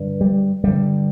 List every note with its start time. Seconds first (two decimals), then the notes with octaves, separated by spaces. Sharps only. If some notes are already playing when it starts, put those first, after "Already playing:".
Already playing: G2 D3
0.21 G3
0.64 G2 D3 G3